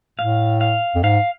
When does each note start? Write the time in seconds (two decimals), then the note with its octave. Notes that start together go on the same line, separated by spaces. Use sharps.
0.19 A2 F5
0.61 F5
0.95 F2
1.03 G#2 F5